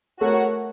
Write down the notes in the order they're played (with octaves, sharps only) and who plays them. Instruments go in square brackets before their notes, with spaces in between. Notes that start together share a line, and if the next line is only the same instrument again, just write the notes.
[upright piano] A3 [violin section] F#4 A#4 C#5 F#5